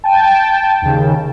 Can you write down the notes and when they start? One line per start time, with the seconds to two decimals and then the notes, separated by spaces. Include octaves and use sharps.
0.04 G5 A5
0.82 D#2 C#3